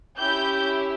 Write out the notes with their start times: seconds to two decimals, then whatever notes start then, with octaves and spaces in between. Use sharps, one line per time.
0.18 C#4 E4 G4 G6